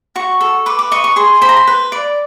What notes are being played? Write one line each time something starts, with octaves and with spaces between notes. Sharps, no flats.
F#4 C#6
A4
B4 D6
D6
D#5 C#6
C#6
G#4 C6
C5 B5
A#5
B5
B4
D5